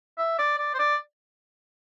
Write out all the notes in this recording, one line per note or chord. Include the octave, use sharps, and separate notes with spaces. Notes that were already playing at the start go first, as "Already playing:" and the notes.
E5
D5
D5
C5
D5